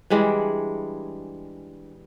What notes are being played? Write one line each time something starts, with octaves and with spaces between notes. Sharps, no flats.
E3 G3 G#3 D4